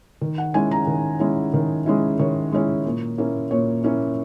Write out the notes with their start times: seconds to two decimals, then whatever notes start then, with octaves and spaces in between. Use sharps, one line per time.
0.21 D#3
0.38 F#5
0.54 G#3 C#4 E4 G#5
0.71 A#5
0.87 D#3
1.20 G#3 C#4 E4
1.54 D#3
1.86 G#3 C#4 E4
2.19 D#3 C#5
2.52 G#3 C#4 E4
2.86 A#2
3.18 A#3 C#4 E4
3.51 A#2 C#5
3.84 A#3 C#4 E4